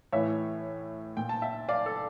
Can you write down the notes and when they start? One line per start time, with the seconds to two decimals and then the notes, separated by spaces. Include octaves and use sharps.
0.12 A2 E3 C#5 E5
1.17 A#2 G5
1.29 A5
1.42 E5 G5
1.69 D5 F5
1.86 A4